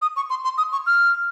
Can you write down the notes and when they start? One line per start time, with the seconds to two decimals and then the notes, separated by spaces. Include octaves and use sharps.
0.02 D#6
0.16 C#6
0.30 C6
0.45 C6
0.58 D#6
0.72 C#6
0.87 F6